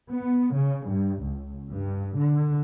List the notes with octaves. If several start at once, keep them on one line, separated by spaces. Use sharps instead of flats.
B3
C#3
G2
C#2
G2
D3